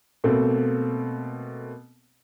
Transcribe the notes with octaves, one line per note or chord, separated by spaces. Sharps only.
B2 A3 A#3 C4